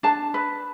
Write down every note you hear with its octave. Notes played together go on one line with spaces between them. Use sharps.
D4 A5
B4